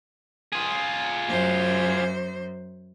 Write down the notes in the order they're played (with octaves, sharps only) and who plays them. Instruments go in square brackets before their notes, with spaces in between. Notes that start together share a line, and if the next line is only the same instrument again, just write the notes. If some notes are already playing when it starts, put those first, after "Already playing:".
[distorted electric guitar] F4 G#4
[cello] F#2 C5